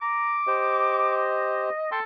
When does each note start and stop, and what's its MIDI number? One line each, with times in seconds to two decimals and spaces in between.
0.02 0.39 82
0.02 1.33 86
0.47 1.70 67
0.47 1.70 72
0.47 1.88 75
1.91 2.03 69
1.91 1.99 79
1.91 1.99 84